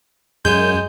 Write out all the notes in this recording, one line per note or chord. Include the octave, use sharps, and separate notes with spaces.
F#2 G#3 G6